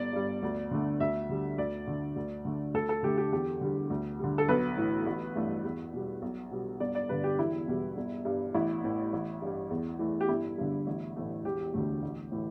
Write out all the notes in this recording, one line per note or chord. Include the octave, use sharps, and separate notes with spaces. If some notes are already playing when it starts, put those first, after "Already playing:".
Already playing: G1 D5
G2 G3
D2
D3 A3
D2 E5
D3 G3
D2 D5
D3 A3
D2
D3 A3
D2 A4
A4
D3 A3 G4
G4
E2 G4
D3 G3
D2
D3 G3
A4
B1 B4
A2 E3
A1
G2 E3 A3
E2
B2 G3
B1
B2 G3
G1 D5
D5
G2 D3 B4
G4
E1 E4
E2 B2 G3
G1
G2 G3
A1 E4
A2 E3
A1
G2 G3
E2
E3 A3
G4
G1 E4
G2 D3
A1
A2 E3 A3
E1 G4
D2 D3 A3
A1
A2 E3